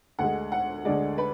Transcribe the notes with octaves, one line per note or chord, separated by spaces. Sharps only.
D2 D3 G#3 F#5
F#5
D2 D3 G#3 D5
B4